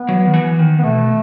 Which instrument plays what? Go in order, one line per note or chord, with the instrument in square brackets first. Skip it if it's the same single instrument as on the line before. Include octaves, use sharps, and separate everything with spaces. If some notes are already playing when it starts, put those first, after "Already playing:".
Already playing: [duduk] B3
[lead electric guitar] F#3
D#3
E3
D#3
[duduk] B3
[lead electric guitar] B2 [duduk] A3